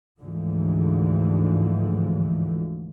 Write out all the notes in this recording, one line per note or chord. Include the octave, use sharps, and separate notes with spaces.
D2 G#2 D3 E3 F3